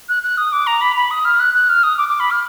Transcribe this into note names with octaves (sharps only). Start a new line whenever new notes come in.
F#6
F#6
D#6
D6
A#5
B5
B5
D#6
F6
F#6
F#6
F6
D#6
D6
D6
B5
F6